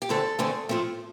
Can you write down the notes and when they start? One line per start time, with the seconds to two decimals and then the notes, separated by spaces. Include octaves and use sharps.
0.02 G4
0.09 E2 D3 A3 C4 A4
0.39 E2 D3 A3 C4
0.69 A2 F3 A3 C4